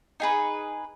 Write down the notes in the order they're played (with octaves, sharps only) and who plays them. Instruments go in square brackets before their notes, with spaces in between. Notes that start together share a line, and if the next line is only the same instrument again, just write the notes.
[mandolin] D#4 G#4 B4